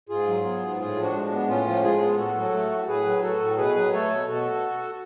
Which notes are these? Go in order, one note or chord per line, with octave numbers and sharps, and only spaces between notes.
G#2 F4 G#4
F#3
B3
G#2
A2 F4 G#4
F3
D4 F#4
G#3
D4
B3
A2 C#4 F4
F3
G#3 F4 G#4
B3
A2 F#4 A4
F#3
A3
A2
A2 G#4 B4
F#3
A3 F#4 A4
A2
B2 G#4 B4
F#3
A3 A4 C#5
B2
B2 F#4 A4